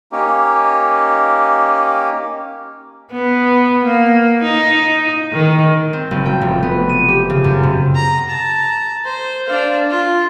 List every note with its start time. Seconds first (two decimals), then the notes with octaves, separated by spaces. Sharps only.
0.12 A#3 C#4 D#4 G4
3.12 B3
3.84 A#3
4.42 D#4
5.32 D#3
5.93 C4
6.11 F#1
6.26 G5
6.41 F1
6.63 B3
6.89 D#7
7.08 G4
7.30 C#3
7.44 F#2
7.63 C3
7.95 A#5
8.29 A5 A#5
9.04 C5
9.47 D4 F5
9.91 F4